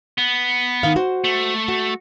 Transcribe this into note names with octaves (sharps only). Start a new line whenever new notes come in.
B3
D#3 F5
F#4 C5
A3
F#4